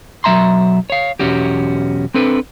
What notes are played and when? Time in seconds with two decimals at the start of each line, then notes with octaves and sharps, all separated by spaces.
0.24 B1 F#3 A#3 E5 A#5 C6
0.90 C#5 F5
1.19 B1 E2 C#4 F#4 G4
2.14 C4 D4 A4 B4